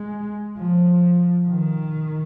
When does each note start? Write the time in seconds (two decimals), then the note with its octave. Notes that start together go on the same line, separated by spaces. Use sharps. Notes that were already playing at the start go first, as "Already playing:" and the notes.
Already playing: G#3
0.59 F3
1.49 D#3